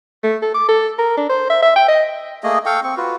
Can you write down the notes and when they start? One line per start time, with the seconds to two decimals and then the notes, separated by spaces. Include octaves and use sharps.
0.23 A3
0.42 A4
0.54 D6
0.69 A4
0.98 A#4
1.17 D4
1.29 C5
1.50 E5
1.62 E5
1.76 G5
1.88 D#5
2.44 A3 A#3 G#4 D#5
2.66 A4 F5 G5 C#6
2.83 C4 C#6
2.97 F4 F#4 B4